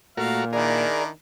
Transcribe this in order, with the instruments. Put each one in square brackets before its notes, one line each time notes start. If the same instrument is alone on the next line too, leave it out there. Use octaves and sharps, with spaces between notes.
[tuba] A#2 [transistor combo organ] A3 F#4 A#4 [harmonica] F5
[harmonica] D#3 D4 E4 [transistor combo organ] G#4 A#4 [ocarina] D5